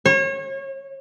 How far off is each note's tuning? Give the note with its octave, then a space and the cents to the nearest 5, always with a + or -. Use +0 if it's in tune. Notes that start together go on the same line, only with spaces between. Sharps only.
C#5 -35